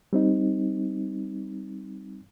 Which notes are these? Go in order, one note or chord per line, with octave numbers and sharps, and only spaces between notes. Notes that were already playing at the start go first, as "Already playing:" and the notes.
G3 C4 D#4